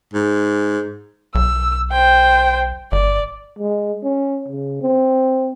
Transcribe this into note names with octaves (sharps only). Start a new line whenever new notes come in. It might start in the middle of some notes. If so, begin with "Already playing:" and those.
G#2
B1 E6
C5 G5
G1 D5
G#3
C#4
C#3
C4